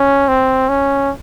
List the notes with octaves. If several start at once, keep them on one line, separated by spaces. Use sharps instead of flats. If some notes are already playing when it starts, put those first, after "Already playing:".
Already playing: C#4
C4
C#4